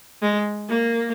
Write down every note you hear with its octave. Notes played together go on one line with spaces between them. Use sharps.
G#3
A#3